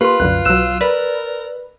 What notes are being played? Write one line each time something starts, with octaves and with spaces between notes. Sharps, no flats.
A#3 F4 G4 B4 C6
C2 F#2 D3 F#6
B1 F#3 E6 F#6 E7
A#4 B4 D5